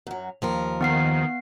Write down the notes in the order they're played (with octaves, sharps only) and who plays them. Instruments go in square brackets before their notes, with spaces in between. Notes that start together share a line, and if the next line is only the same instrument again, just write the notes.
[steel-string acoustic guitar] F#2 F#3
D#2 F3 A#4
[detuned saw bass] D#3 [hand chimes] B3 F#5 C7